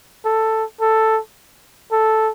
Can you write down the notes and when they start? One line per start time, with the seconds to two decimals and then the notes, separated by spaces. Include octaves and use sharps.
0.25 A4
0.80 A4
1.92 A4